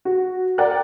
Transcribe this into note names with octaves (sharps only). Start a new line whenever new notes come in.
F#4
A#4 D5 F#5 G5 F#6